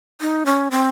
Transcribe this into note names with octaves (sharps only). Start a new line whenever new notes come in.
D#4
C#4
C4